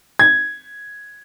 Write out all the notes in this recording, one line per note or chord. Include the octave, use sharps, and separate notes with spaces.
G#6